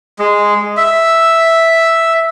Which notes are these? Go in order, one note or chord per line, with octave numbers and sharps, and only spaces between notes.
G#3
E5